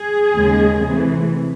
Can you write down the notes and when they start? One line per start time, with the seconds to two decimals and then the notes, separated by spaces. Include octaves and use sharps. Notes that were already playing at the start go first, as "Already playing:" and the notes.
Already playing: G#4
0.34 D#2 C#3 G#3
0.84 C3 E3 A3